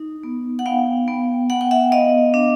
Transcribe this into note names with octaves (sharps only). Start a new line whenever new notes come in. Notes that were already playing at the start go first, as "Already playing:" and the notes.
Already playing: D#4
B3
F#5
B3 F5 G5
B3
B3 F#5
G5
E5 F#5
B3 D#5 F5
D4